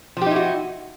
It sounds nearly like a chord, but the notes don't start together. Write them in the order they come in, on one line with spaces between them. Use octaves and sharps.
F3 G4 D#4 E4 F#4